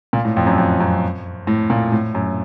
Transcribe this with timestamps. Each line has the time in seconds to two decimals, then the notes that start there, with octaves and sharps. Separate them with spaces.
0.13 A#2
0.25 A2
0.37 F2
0.46 F#2
0.58 F2
0.80 F#2
1.47 A2
1.70 A#2
1.92 A2
2.15 F#2